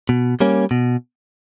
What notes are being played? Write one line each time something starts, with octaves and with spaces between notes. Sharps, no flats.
B2
G3 A#3 C#4
B2